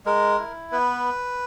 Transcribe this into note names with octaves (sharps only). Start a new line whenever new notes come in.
G#3 A#4
E4
B3 B4